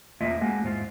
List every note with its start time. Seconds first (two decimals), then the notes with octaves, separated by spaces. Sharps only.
0.21 E2 A#3 F4 D#5 E5
0.41 G#3 A#3 F#4
0.63 E2 G#2 D4 F4